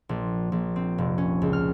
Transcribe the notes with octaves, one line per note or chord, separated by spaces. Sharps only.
A#1
A#1
C4
F1
C#4
C#2
F6